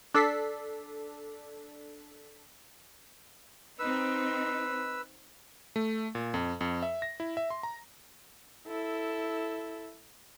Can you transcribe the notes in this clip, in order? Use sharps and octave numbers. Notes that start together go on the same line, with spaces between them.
D4 A4 B6 C7
C4 D#4 B4 E6
A3
A#2
F2
F2
E5
A#6
E4
E5
C6
A#5
E4 A4